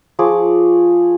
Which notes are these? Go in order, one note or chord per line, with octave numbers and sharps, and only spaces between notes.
F3 G#4 C#6 D6